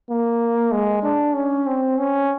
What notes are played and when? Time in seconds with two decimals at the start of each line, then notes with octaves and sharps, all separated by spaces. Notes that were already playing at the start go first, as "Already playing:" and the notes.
0.10 A#3
0.72 G#3
1.03 D4
1.35 C#4
1.67 C4
1.98 C#4